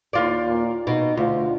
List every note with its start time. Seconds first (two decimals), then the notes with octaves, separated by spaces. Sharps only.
0.13 D#2 F4 D5
0.47 A#2
0.87 B2 D#4
1.17 D2 F4